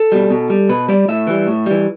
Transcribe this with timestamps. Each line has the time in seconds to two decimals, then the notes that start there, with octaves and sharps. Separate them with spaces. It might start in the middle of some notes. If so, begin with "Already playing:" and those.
Already playing: A4
0.12 B2 G3
0.30 B2
0.50 G3
0.69 B2 B4
0.88 G3 D5
1.08 A2 E5
1.27 E3 G3
1.47 A2
1.66 E3 G3